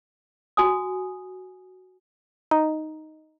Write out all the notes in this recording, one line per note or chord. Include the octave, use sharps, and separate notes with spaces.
F#4 G#5 D#6
D#4